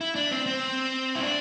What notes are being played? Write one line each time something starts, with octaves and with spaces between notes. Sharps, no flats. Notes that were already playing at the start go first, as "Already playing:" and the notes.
E4
D4
C4
C4
E4
D4